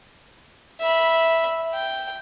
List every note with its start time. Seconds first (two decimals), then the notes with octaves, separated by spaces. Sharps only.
0.81 E5 B5
1.74 G5